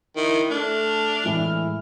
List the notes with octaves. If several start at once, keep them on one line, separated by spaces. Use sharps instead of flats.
D#3 E4
A3 D4 F6
A2 E3 G#3 E4